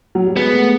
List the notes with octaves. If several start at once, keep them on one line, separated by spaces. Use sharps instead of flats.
F#3
G3
G#3 B3
A3